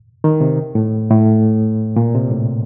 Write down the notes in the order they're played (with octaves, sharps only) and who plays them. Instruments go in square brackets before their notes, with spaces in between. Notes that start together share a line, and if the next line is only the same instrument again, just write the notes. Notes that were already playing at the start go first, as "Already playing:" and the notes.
[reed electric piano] D#3
C3
A2
A2
A#2
C3
A2